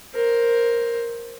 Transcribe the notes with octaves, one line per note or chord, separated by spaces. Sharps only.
A#4 C5